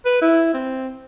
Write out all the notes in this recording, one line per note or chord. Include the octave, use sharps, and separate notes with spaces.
B4
E4
C4